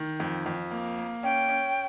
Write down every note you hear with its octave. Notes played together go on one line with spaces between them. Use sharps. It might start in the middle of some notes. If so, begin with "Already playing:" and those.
Already playing: D#3
F2
F2
A#3
A#3
C#4 G5
C#4